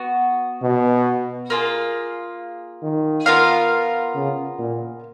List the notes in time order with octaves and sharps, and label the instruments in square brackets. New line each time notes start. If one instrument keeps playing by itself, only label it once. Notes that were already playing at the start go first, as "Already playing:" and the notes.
Already playing: [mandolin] B3 F#4
[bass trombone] B2
[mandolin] A#3 F4 G#4
[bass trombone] D#3
[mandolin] B3 F4 A#4 F5
[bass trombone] C#3
A#2